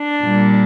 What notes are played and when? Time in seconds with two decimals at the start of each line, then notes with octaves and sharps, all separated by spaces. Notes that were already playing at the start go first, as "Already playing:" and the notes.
Already playing: D4
0.23 A#2 G3 A#3